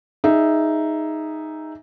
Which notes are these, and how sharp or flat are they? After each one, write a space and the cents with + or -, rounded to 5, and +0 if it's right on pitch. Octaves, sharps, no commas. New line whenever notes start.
D#4 +0 G#4 +0 E5 +0